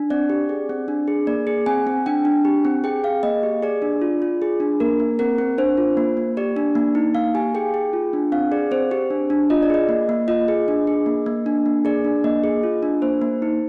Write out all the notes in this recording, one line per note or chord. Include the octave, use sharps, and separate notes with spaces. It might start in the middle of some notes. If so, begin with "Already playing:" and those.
Already playing: D4
C4 D5
G4
G#4
C4
D4
G#4
A#3 D5
G#4
C4 G#5
C4
D4 G5
D4
G4
C4
G#4 G5
G#4 F5
A#3 D#5
G4
G#4 D5
D4
F4
F4
G#4
D4
A#3 A#4
A#3
C4 A#4
C4
D4 C5
F4
A#3
A#3
G4 D5
D4
A#3
D#4
A#3 F5
G4 G#5
G#4 G5
G#4
F4
D4
C4 F5
G#4 D5
C4 C5
G4
D4
D4
F4 D#5
D5
G#4 D#5
A#3
A#3
F4 D#5
G#4
D4
G#4
A#3
A#3
D4
A#3
G#4 D5
D4
A#3 D#5
G#4
F4
D4
A#3 C5
A#3
D#4